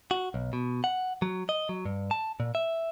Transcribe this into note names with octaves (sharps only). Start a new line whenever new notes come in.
F#4
B1
B2
F#5
F#3
D#5
F#3
G2
A5
A#2
E5